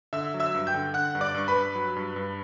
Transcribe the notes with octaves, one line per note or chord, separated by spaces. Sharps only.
D3 E5 E6
F#3
E5 E6
G2
G5 G6
D3
D3 F#5 F#6
G2
D5 D6
G2 C#6
B4 B5
G2
F#3
G2
G2